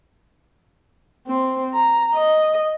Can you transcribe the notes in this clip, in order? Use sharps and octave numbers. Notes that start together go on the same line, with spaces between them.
C4
A#5
D#5